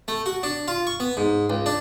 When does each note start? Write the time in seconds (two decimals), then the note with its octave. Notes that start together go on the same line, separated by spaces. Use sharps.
0.08 A3
0.26 F#4
0.43 D4
0.68 F4
0.87 C#6
1.00 B3
1.17 G#2
1.50 C#2
1.66 D4